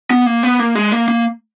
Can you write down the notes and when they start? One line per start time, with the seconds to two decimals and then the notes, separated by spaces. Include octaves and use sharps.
0.11 B3
0.26 A#3
0.43 B3
0.59 A#3
0.75 G#3
0.92 A#3
1.08 A#3